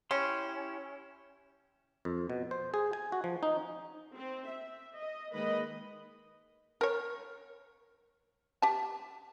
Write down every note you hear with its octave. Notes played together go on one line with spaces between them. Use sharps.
C#4 E4 G4 C6
F2
B2
C5
G#4
G#5
F#4
F3
D#4
C4
E5
D#5
D#3 G#3 A#3 B4 D#5 B5
A#4 C#5
G4 A5